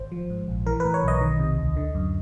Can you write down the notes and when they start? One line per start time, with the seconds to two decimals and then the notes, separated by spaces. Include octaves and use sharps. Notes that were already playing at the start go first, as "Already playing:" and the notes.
Already playing: G#1 C5
0.12 F3
0.30 G#2
0.48 A#1
0.66 E3 A#4
0.80 A2 B4
0.94 C#5
1.03 B1 D#5
1.21 D#3
1.39 C3
1.58 D2
1.77 D3
1.95 F#2